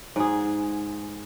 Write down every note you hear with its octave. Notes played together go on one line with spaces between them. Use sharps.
G#2 G#4